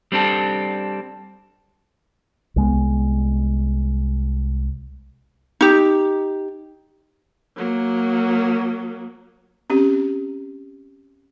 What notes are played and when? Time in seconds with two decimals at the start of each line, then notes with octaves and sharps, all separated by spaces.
0.12 G3 C4 D4 A4
2.56 C2 G#3 B3
5.61 D#4 G4
7.56 F#3 A#3
9.70 C4 C#4 G4